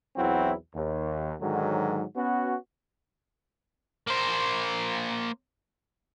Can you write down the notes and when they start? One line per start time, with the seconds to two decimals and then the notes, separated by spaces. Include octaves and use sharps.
0.16 B1 E2 F#3 C4 E4 F#4
0.75 D#2
1.41 G#2 D3 D#3 F#3
2.16 B3 C#4 F#4
4.07 A#3 C5